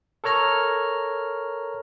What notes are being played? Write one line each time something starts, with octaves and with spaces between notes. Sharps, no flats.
A4 A#4 C#5 A#5 F6